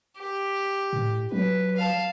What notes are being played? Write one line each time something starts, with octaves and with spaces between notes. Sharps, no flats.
G4
A2
F#3 B4
F5 A5